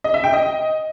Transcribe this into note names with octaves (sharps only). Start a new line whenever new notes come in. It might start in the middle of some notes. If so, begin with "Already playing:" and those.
D#5
E5
G5
D#5